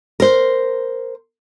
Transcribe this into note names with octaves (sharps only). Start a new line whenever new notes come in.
A#4 C5